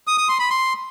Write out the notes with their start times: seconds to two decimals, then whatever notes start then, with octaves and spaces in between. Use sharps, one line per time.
0.07 D#6
0.18 D#6
0.29 C6
0.39 B5
0.50 C6